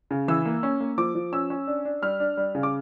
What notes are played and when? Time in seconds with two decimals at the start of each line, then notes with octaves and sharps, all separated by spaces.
0.11 C#3
0.28 E3 E6
0.45 A#3
0.63 C#4
0.80 A#3
0.98 F3 D6
1.15 F3
1.33 C#4 E6
1.50 C#4
1.67 D4
1.85 D4
2.02 G3 F6
2.20 D4
2.37 G3
2.55 C#3
2.63 D6